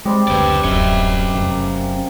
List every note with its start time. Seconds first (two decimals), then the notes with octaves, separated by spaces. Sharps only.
0.05 G3 G#3 C4 G4
0.28 F#1 D2 B4 D5
0.64 D1 F#2 C#4 D#5 E5
1.35 F1 A#3 C4